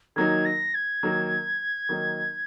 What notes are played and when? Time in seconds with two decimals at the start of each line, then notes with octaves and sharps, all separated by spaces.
0.16 D#3 F#3 A#3 D#4 G#6
0.45 A#6
0.74 G#6
1.03 D#3 F#3 A#3 D#4
1.89 D#3 F#3 A#3 D#4